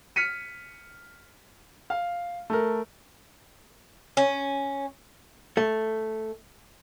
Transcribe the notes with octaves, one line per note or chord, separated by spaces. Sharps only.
F6 B6 C#7 D#7
F5
A3 A#4
C#4
A3